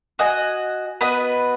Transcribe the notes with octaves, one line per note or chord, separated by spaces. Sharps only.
F#4 D#5 G#5
B3 F#4 B4 D#5